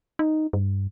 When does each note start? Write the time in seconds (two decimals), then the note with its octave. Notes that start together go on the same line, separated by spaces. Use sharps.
0.19 D#4
0.53 G2